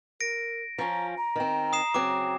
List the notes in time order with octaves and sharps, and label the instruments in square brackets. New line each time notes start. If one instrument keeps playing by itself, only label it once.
[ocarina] A#4 [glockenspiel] A#6 D7
[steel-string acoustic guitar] F3 C#4 [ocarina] A#5
[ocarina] A#5
[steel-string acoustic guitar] D#3 C4
[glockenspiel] D#6 C7 E7
[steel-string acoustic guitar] C#3 F#3 C4 [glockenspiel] D6